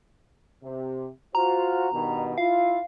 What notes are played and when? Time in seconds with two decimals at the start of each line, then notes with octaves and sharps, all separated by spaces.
0.64 C3
1.35 F4 F#4 C5 A#5
1.93 G2 B2 D#3
2.38 E4 F4 F5